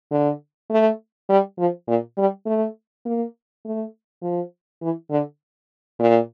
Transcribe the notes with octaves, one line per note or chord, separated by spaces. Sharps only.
D3
A3
G3
F3
A#2
G3
A3
A#3
A3
F3
E3
D3
A#2